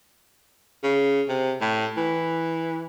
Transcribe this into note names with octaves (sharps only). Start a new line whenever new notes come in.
C#3
C3
A2
E3